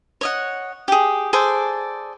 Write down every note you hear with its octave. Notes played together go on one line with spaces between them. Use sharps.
C#5 D#5 F#5
G4 G#4
G#4 A4 C5 D5